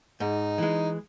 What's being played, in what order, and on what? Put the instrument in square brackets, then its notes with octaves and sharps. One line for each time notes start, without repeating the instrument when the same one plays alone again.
[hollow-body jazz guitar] G#2 [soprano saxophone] D#4
[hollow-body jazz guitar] E3 G#3